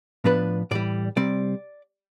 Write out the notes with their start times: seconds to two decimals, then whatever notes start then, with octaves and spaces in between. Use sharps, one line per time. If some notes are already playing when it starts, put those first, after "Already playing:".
0.24 A2 F3 B3 D4 B4
0.71 A2 E3 G3 D5
1.16 C3 G3 C4 D5